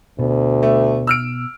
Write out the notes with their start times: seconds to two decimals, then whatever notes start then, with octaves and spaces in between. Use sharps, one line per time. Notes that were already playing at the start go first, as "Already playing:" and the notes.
0.19 D2 B2
0.63 A3
1.07 E6 F6 D7